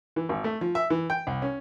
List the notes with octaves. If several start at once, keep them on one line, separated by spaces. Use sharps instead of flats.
E3
G#1
A3
F3
E5
E3
G5
C2
C#4